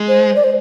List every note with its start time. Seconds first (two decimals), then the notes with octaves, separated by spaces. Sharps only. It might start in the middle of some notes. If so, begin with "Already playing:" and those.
Already playing: G#3
0.08 C5
0.36 D5
0.44 C5